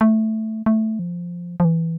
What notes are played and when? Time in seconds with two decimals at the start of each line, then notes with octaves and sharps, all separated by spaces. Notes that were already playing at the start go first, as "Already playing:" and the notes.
0.01 A3
0.66 A3
0.99 F3
1.60 F3
1.65 E3